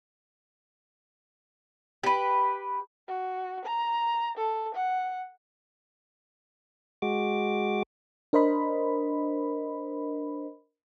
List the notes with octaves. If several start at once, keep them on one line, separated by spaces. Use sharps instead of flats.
G4 B4
F#4
A#5
A4
F#5
G#3 F#4 D6
D4 A#4 C5 D#5 B5